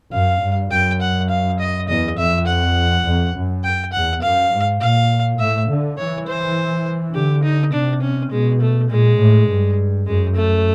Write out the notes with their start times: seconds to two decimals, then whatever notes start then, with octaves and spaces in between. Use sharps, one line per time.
0.13 F#2 F5
0.42 G2
0.71 F#2 G5
1.01 F#5
1.30 F5
1.59 D#5
1.88 E2 D#5
2.18 F2 E5
2.47 F#5
3.05 F2
3.35 F#2
3.64 G5
3.93 E2 F#5
4.22 F#2 F5
4.51 G#2
4.81 A#2 F5
5.39 A2 E5
5.68 D3
5.98 E3 C#5
6.26 C5
7.14 D3 G4
7.43 D#4
7.72 C3 D4
8.02 C#4
8.31 B2 G#3
8.61 A3
8.90 A#2 G#3
9.19 A2
9.48 G2
10.07 F#2 G#3
10.36 A3